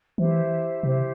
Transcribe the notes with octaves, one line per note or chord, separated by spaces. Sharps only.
E3 E4 G4 C5 E5
C3 E4 G4 C5 E5